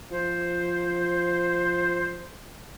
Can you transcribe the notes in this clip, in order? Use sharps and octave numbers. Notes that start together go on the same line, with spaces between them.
F3 C5